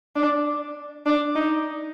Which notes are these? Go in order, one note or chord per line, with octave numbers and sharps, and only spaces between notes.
D4
D4
D#4